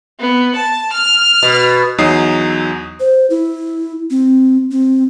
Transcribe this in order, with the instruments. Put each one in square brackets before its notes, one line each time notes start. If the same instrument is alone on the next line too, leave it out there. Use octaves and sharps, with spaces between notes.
[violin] B3
A5
F6
[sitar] B2
[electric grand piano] E2 F#3 D#4 D#6 C7
[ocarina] C5
E4
C4
C4